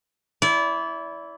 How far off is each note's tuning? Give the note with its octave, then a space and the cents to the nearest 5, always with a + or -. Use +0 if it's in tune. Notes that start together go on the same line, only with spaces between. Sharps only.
E4 +0 D5 -30